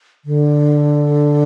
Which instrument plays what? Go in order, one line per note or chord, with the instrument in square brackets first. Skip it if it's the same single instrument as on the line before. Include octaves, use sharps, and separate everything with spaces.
[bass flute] D3